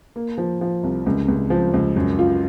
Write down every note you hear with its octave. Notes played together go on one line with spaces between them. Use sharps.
A#3
F3
F3
C2
C#2
C#2
F3
C#2
F#2
F4